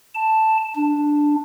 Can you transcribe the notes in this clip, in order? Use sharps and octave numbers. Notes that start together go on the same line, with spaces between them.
A5
D4